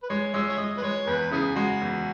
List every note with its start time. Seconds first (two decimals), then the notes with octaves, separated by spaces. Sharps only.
0.03 B4
0.09 G#3 C#5
0.34 G#3 G#4 C#5 E5
0.49 C#5
0.58 G#3 D#5
0.77 B4
0.82 G#3 C#5
1.07 E2 B4
1.31 C#3 C#4 E4 G#4
1.56 G#3 F#4
1.81 E2